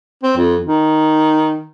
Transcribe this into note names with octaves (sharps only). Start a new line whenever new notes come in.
C4
F2
D#3